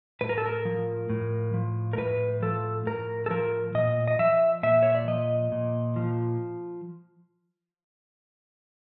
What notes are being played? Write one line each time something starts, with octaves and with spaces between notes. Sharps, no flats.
A2 B4
A#4
A4
A#4
F3
A2
F3
A#4
A2 B4
F3 A4
A2 A#4
A4
F3 A#4
A#2 D#5
D#5
F3 E5
A#2 E5
C#5
D5
F3 D#5
A#2
F3